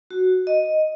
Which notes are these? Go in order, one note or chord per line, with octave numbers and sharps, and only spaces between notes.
F#4
D#5